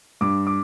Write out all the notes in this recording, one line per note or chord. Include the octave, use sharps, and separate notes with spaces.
G2 D6
D6